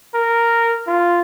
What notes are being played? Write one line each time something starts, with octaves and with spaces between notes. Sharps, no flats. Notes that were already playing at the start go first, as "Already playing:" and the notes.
A#4
F4